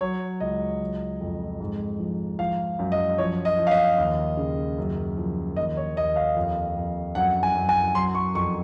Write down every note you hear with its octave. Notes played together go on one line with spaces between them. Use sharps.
F#3 C#5
C#2 D#5
F#3
F2
G#2
F3
F3 F5
F#2
D#5
F3 C#5
D#5
F3
F5
D#5
D#2
C#3
F#2
F3
D#2 D#5
C#5
D#2 D#5
F5
F2
F2
F#2 F#5
G#5
F#2
G#5
F#3 C6
C#6
F2 C#6